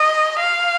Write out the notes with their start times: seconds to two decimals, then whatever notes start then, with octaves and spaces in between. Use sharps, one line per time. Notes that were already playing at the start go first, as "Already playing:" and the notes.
Already playing: D#5
0.39 F5